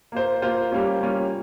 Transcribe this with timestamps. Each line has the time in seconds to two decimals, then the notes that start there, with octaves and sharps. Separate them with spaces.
0.12 A#3 F4 C5
0.42 A#3 F4 C5
0.71 G3 A#3 C#4 F4
1.01 G3 A#3 C#4 F4